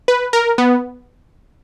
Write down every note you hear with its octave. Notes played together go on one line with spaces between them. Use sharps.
B4
A#4
B3